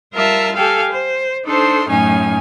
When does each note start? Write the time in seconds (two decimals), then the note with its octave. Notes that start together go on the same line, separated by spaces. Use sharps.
0.13 G3 F4 A#4 E5 A5 F6
0.55 G4 A4 F5 G5 G#5
0.91 C5
1.45 D4 D#4 A4 C5 C6
1.88 F#2 A2 C#4 D#4 G#5